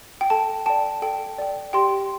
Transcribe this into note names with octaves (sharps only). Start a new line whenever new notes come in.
G5
A4 A5
D5 G5 A5
A4 G5
D5 G5
G4 G5 C6